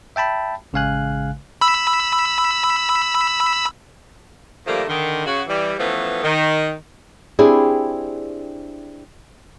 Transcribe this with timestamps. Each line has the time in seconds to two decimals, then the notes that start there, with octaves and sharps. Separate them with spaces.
0.16 E5 G5 A5 B5
0.73 A1 C#3 G#3 F5 G#5 F#6
1.61 B5 E6
4.67 D#3 F3 G3 A3 A#3
4.88 D3 D#3
5.26 C#3 F#4
5.47 E3 G3
5.79 E3 F3 A3 B3 C#4
6.23 D#3
7.39 C4 D4 E4 G4 G#4